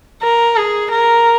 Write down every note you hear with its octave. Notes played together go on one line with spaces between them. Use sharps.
A#4
G#4
A#4